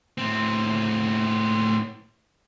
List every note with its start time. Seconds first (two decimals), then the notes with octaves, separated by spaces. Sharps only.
0.18 A2 C4